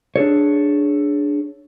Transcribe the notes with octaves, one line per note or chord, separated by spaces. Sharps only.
D4 G#4 A4 C#5